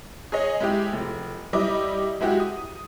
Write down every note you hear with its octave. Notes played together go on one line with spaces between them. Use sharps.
G#4 C#5 D#5
G#3 E4 G4
F1
G3 E4 D#5 D6
G#3 E4 F#4 G4
D#6